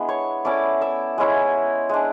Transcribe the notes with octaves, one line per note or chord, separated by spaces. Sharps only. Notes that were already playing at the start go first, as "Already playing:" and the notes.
Already playing: G#3 B3 D4 E4
C#5 C#6
A3 C#4 E4 D5 D6
E5 E6
G#3 C#4 E4
G#3 D4